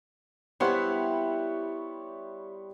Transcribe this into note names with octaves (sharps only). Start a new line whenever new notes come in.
G3 B3 E4 G4 C5 C#5 E5 F#5